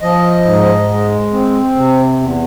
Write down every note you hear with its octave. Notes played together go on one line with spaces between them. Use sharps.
F3 D#5
G#2
G#3
C4
C3
E2